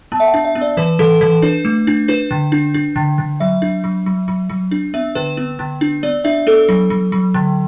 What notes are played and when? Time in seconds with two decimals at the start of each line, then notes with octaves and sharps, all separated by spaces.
0.12 B3 A5
0.20 E5
0.27 F#5
0.34 D4
0.45 E5
0.55 B3
0.61 D5
0.77 E3 B4
0.99 E3 A4
1.21 E3 B4
1.42 D4 B4
1.65 A3
1.87 D4
2.08 D4 B4
2.31 D3
2.52 D4
2.74 D4
2.96 D3
3.18 D3
3.40 F#3 E5
3.62 D4
3.84 F#3
4.06 F#3
4.28 F#3
4.50 F#3
4.71 D4
4.94 B3 E5
5.15 D3 B4
5.37 B3
5.59 D3
5.81 D4
6.03 B3 D5
6.24 D4 E5
6.47 B3 A4
6.69 F#3
6.90 F#3
7.12 F#3
7.34 D3